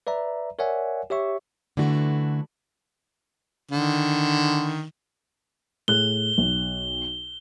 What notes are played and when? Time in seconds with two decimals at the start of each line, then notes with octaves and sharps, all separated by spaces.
0.07 B4 D5 E5 A#5
0.59 A#4 C#5 D5 E5 F#5 G#5
1.10 G4 C#5 E5 C#6
1.77 D3 E3 A3 D4 F#4
3.71 D3 D#3
5.88 A2 G#4 F#6 G7
6.38 B1